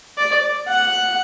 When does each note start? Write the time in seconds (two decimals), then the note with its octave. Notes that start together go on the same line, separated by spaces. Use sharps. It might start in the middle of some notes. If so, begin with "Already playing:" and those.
0.18 D5
0.69 F#5